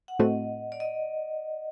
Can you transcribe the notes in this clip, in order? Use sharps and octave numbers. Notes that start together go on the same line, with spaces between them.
F#5
A2 A3 C4 F#4 D#5
D5
D#5